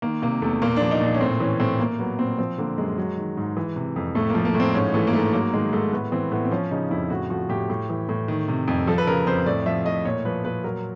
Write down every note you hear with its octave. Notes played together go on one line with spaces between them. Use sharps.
D#3 A#3
C3 A#3
E2 A3
A#2 A#3
F3 D4
D#4
A#2 D4
C#4
A2 C4
E3 C#4
A2 C4
A#2 A#3
F#3 B3
A#2 C4
F3 C4
D3 A#3
F#2 G#3
F#3
D#3
G#2
E3
C3
F2
A2 A3
F3 A#3
A#3
A2
C4
G#2 C#4
E3 A3
A#3
G#2 A3
F#3 A#3
D#3 G#3
G#2 A3
A2 B3
E3 C4
A2 B3
C4
F3 C#4
C#3 D#4
F2 E4
A2 F#4
F3 F#4
A2 G4
A2
E3
A2
D#3
C3
F2
F3 A4
B4
C#3 A#4
F2 C5
A2 D5
F3 E5
A2 D#5
A#2 C#5
F3 B4
A#2 B4
F#3 A#4